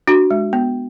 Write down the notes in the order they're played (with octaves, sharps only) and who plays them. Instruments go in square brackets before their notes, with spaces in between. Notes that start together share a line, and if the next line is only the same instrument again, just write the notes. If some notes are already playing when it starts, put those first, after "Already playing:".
[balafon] D4 F#4
G#3
B3